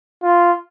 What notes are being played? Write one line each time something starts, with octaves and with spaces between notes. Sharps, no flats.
F4